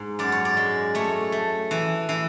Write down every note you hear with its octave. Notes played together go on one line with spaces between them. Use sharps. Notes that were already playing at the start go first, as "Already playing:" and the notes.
Already playing: G#2
F#2 D5
C#5
D5
G#3
A3 C#5
A3
E3
E3